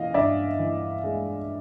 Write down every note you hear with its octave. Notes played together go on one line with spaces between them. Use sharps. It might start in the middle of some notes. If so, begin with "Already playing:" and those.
Already playing: E3 D#5 F5
G2 D5 E5
E3
G#3